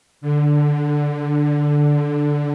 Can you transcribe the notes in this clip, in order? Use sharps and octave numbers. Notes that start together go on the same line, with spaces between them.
D3